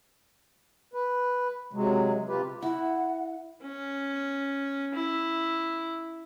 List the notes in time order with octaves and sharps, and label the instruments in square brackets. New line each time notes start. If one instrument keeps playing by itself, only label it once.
[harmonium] B4
C3 F#3 G#3
C3 F4 G4 B4
[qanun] E4 [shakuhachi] F#5
[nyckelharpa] C#4
E4